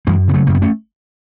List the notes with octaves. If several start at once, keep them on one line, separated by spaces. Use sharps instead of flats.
F#2 E3 G#3
C#3 B3
F#3 A3
F#2 A3
B3
A3 C#4